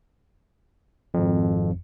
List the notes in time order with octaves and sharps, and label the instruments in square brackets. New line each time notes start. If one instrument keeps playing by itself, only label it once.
[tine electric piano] G#1 F2